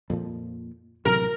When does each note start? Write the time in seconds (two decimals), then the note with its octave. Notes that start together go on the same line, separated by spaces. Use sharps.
0.10 F2 A#2 F3
1.05 A1 C3 F#3 A#4